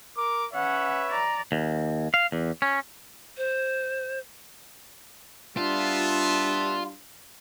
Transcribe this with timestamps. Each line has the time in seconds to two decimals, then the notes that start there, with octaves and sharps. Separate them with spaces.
0.17 A#4 D6
0.54 C#4 B4 C#5 E5 F#5
1.10 D5 A#5
1.52 D#2
2.14 F5
2.32 E2
2.62 C#4
3.37 C5
5.57 G3 B3 D4 F4 E5 A5